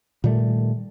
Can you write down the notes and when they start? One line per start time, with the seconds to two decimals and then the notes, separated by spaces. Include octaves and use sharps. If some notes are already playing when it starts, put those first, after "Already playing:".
0.24 A#2 D#3 G3 A3